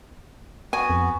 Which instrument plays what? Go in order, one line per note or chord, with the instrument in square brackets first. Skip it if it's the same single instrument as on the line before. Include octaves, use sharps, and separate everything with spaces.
[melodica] B3 F#4 [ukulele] G#5
[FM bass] F2